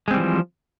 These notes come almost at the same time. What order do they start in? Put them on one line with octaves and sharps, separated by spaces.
G#3 C4 G3 E3 F3